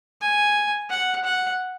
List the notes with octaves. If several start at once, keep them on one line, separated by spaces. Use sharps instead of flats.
G#5
F#5
F#5